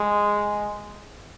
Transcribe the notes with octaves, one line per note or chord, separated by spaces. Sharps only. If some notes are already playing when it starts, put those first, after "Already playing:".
Already playing: G#3